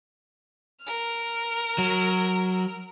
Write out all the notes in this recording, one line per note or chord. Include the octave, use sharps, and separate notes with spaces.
A#4 F6
F#3